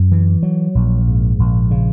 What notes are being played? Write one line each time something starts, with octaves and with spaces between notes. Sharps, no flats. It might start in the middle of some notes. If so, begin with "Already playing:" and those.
Already playing: F#2
E3
F#3
A#1
G#2
A#1
C#3